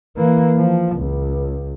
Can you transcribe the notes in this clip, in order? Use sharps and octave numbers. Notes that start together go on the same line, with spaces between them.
E3 A#3
F3
C#2